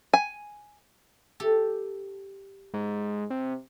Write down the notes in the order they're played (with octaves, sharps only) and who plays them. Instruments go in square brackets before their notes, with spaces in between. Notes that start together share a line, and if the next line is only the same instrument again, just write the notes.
[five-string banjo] G#5
[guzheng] G4 A4
[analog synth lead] G#2
C3